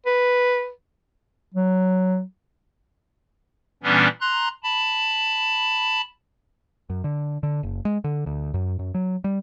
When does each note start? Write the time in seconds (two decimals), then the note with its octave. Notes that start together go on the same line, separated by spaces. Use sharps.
0.06 B4
1.54 F#3
3.83 A#2 E3 G3 B3 C#4 D4
4.21 A#5 C6 F#6
4.63 A5 B5
6.90 F#2
7.04 D3
7.43 D3
7.63 F#1
7.85 G#3
8.04 D3
8.26 D2
8.54 F#2
8.79 F#2
8.94 F#3
9.24 G3